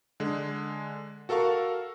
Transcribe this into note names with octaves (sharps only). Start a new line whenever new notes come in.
D3 G#3
F#4 A4 A#4 F5 C#6